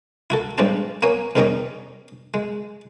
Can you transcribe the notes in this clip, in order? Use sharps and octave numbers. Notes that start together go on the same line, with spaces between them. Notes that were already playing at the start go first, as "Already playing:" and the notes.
E4 F#4 A4
A1 G2 G3 G#3 C#4 A5
A#3 B3 C#5 G#5
E2 D#3 G3 C#4 D#5 C#6
G#3